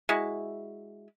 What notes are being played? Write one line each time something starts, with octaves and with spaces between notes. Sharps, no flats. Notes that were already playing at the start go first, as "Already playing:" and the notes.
G#3 E4 F#4